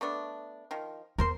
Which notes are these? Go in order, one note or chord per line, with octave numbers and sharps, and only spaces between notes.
A3 B3 D4
D#3 F3
E2 A#4 C5 C6